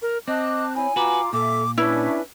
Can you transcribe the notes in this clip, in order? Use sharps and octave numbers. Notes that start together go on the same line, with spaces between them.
A#4
C4 D#5 A5 D6 F#6
E4 C#5 G#5 B5
F4 F#4 B4 A#5 D6
A#2 A4 E5 D6
C#4 D4 E4 B4 E5